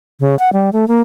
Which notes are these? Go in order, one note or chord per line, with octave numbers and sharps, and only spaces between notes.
C#3
F#5
G3
A3
A#3